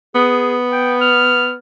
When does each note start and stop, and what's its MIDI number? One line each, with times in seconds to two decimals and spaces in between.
0.15 1.56 59
0.15 0.55 68
0.72 0.94 79
1.01 1.54 89